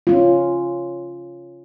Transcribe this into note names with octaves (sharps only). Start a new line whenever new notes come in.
C#4 F4